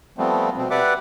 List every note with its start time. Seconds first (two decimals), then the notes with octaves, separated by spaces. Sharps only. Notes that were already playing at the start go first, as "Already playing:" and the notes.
0.18 F3 G3 A3 B3 C4
0.57 B2 C4
0.71 G4 B4 D5 E5 F#5 D6